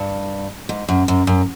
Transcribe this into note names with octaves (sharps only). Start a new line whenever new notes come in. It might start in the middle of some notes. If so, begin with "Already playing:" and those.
Already playing: G2
G#2
F#2
F#2
F#2